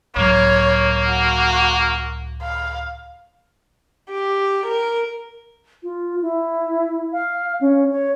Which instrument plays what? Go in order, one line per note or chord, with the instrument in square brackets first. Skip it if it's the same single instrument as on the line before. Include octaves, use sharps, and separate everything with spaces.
[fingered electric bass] C#2 A2 F#3 [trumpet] A#3 [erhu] C#5
[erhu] F#4
F5
[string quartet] G4
A#4
[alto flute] F4
E4
F5
C#4
C#5